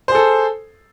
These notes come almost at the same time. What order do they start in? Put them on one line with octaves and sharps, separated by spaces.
C5 G#4 A4